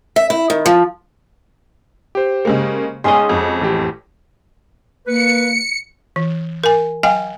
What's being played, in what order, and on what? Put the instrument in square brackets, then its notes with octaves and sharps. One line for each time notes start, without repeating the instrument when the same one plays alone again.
[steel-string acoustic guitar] E5
E4
D#3
F3
[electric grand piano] G4 C5
[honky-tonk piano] C#3 G#3 A#3
[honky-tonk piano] B1 [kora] G#3 C#4 D#5 [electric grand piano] G#4 C6
[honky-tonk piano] F2 [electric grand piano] F#4
[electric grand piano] A1 G4
[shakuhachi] A#3 [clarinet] B4 [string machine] C#7
[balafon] E3
A#4 G#5
F#3 F5 G5 G#5